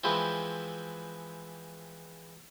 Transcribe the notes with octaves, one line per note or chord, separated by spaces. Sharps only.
E3 F3 G#3 C4 E4